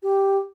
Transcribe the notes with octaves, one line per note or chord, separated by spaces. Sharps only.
G4